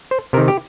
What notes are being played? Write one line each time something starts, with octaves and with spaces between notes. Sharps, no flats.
C5
C3 D#3 A#4
G4